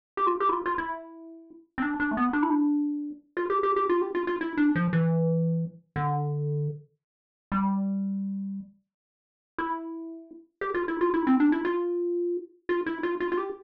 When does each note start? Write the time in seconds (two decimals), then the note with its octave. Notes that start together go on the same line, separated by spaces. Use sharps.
0.17 G4
0.27 F4
0.40 G4
0.49 E4
0.53 F4
0.66 F4
0.78 E4
1.78 C4
1.82 D4
2.00 D4
2.11 A3
2.17 B3
2.33 D4
2.43 E4
2.50 D4
3.37 F4
3.50 G4
3.63 G4
3.76 G4
3.89 F4
4.02 G4
4.15 F4
4.27 F4
4.41 E4
4.57 D4
4.75 F3
4.93 E3
5.96 D3
7.52 G3
9.58 E4
10.61 G4
10.74 F4
10.88 E4
11.01 F4
11.14 E4
11.27 C4
11.40 D4
11.52 E4
11.65 F4
12.69 F4
12.86 E4
13.03 F4
13.20 F4
13.32 F4
13.37 G4